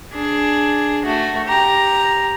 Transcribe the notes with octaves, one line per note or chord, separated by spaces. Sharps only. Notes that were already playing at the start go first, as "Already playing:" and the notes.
D4 G#4
A3 F#4
G4 A#5